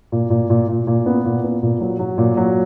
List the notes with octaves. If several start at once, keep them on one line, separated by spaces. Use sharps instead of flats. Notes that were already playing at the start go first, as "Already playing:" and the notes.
A#2
A#2
A#2
A#2
A#2
B3
A#2
B3
A#2
F#3
F#3
A#2
F#3